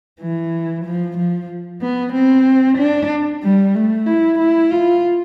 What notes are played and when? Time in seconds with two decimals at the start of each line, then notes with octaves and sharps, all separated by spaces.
0.20 E3
0.84 F3
1.17 F3
1.81 B3
2.13 C4
2.78 D4
3.43 G3
3.75 A3
4.06 E4
4.39 E4
4.71 F4